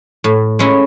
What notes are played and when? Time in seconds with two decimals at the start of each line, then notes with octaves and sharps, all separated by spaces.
0.24 A2
0.59 G#3 C#4 E4